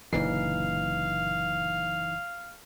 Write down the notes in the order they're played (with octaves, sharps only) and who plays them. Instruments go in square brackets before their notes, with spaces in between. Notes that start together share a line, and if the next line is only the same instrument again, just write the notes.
[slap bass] F#1 A#2 D3 [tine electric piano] E3 D#4 C7 [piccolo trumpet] F5